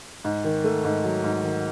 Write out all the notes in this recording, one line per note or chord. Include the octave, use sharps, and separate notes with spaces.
G#2
D#3
A3
G#2
F#3
G#2
D#3